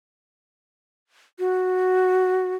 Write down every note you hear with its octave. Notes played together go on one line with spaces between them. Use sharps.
F#4